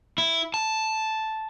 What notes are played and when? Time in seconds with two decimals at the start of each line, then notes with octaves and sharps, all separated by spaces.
0.18 E4
0.54 A5